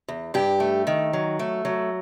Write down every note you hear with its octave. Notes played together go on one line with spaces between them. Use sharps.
E2
G2 G4
A3
D#3
F#3
A3
F#3